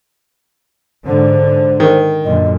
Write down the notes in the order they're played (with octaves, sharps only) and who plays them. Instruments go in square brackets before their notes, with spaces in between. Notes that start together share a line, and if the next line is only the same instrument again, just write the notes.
[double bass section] G#2 D3 [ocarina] C5
[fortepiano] D#3
[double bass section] F#2 A#2 D3 [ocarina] D#5